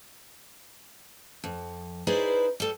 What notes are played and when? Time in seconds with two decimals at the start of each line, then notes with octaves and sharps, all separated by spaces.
1.44 F2
2.07 D#4 E4 G#4 B4 C5 D5
2.60 G3 A4